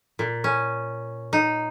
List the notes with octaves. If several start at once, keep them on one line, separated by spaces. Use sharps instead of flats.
A#2
C#4
D#4